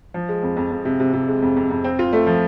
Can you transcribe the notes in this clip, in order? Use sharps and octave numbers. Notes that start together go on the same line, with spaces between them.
F3
G#3
F2
F2
F2
C3
C3
C3
G#3
F2
F2
F2
C4
F4
A3
F3